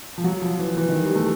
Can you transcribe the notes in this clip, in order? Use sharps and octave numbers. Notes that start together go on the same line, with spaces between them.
F3
F#3
F3
E3
E3
D#3
G3
A3